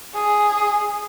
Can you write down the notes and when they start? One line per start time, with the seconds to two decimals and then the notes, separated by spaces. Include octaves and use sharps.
0.14 G#4